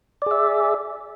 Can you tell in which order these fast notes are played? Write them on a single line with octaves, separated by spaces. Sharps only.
D5 G#4 E5